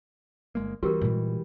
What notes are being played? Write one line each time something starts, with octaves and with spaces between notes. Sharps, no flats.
G1 G#3 A#3
E3 G3 C4 F#4 G4 A#4
A#2 G#3